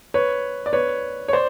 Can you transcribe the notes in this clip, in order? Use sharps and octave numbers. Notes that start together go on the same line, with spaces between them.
B4 C#5
D5
B4 C#5
C#5
C5 D5